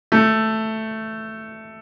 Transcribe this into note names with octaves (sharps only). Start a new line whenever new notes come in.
A3